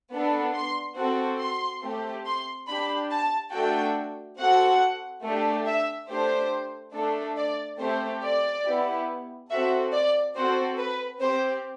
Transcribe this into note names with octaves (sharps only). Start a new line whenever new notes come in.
B3 D4 A4
C6
C4 F#4 A4
C6
A3 C4 G4
C6
D4 G4 B5
A5
A3 D4 F#4 A4 G5
C4 F#4 A4 F#5
A3 D4 G4
E5
A3 D4 G4 C5
A3 D4 A4
D5
A3 C4 G4 C5
D5
B3 E4 G4
C4 F#4 A4 E5
D5
C4 F#4 A4 C5
B4
C4 G4 C5